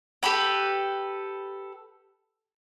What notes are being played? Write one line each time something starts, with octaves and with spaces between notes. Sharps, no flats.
G4 A4 B4 G5